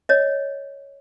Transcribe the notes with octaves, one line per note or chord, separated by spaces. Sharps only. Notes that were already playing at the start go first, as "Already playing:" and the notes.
C#5 D#5